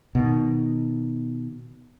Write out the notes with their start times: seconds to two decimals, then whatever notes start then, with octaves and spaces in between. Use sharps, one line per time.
0.15 B2 D#3